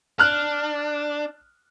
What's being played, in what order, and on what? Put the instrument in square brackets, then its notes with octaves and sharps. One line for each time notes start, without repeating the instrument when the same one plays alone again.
[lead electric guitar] D4 [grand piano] F6 F#6